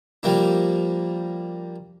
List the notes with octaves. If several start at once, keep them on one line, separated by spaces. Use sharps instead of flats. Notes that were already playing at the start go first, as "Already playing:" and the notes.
F3 G3 A#3 D4